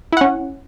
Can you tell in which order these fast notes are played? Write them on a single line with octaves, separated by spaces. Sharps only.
E4 F#5 C#4